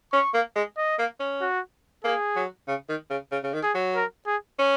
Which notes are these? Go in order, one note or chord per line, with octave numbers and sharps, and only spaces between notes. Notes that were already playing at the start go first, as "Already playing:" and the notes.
C#4 C#6
A#3
G#3
D#5
A#3
C#4
F#4
A#3 G#4
F#3
C#3
D#3
C#3
C#3
C#3
D#3
G#4
F#3
A#4
G#4
C#4